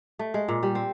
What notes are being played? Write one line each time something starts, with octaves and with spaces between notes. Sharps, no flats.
A3
G#3
A#2
G3
C4